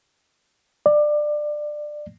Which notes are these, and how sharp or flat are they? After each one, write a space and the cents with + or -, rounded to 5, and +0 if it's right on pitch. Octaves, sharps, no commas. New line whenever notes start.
D5 +20